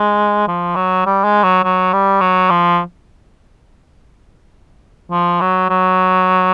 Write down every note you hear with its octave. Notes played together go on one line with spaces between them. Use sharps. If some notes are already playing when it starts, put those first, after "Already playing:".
Already playing: G#3
F3
F#3
G3
G#3
F#3
F#3
G3
F#3
F3
F3
F#3
F#3